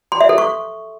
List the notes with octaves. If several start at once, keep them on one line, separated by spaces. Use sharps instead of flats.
C6
E5
A4
C#6